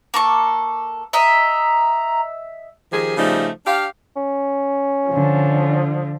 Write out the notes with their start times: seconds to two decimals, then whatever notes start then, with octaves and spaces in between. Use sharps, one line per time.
0.14 A#3 A4 C#6
1.13 D#5 E5 A#5
2.92 D#3 F3 G4 G#4
3.17 C#3 F3 G3 A3 D#4
3.66 D4 G4 F5
4.16 C#4
5.09 D3 F3